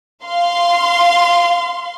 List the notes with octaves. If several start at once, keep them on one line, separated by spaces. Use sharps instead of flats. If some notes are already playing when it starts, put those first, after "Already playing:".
F5 C6